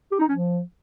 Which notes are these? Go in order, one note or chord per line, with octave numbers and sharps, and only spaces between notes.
G4
D#4
F3 C#4